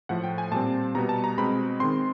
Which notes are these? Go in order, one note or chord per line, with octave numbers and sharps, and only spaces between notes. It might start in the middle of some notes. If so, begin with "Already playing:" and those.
A2 F3 A3 F#5
G5
G#5
A#2 G3 C4 A5
B2 G3 B3 A#5
A5
A#5
B2 G#3 C4 B5
D#3 G#3 C4 C6